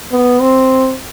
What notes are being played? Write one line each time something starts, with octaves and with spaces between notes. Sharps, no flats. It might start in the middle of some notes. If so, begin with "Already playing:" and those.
B3
C4